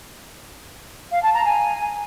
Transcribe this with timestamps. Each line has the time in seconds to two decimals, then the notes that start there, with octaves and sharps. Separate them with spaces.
1.12 F5
1.23 A5
1.34 A#5
1.45 G#5